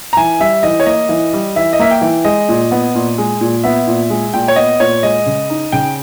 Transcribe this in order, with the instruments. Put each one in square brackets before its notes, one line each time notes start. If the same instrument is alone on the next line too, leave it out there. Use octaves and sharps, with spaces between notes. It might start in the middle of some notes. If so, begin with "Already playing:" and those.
[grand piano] A#5
[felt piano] E3 [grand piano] G#5
[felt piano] G3 [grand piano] E5
[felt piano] E3 [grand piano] D#5
[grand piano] C#5
[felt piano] A#3 [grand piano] D#5
[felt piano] E3
G3
[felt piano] E3 [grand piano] E5
[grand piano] D#5
[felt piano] A#3 [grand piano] E5
[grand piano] G5
[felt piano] E3
[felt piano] G#3 [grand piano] D#5
[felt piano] A#2
B3
A#2
G#3
A#2
[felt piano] B3 [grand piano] E5
[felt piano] A#2
G#3
[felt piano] A#2 [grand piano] G5
[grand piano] C#5
[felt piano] B3 [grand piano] D#5
[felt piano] A#2 [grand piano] C#5
[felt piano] G#3 [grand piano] D#5
[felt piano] C#3
D#4
[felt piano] C#3 [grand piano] G5